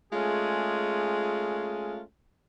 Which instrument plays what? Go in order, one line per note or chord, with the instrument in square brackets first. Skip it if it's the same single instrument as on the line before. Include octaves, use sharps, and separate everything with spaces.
[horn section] G#3 A3 C#4 F4 G#4